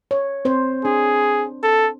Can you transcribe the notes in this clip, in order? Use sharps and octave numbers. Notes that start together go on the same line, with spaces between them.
C#5
C4 C5
D4 G#4
A4